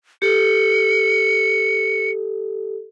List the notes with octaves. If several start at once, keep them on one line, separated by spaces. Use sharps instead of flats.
G4 A4 C#7